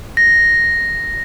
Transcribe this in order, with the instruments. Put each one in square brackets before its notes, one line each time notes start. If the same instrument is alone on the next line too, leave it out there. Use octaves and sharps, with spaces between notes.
[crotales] A#6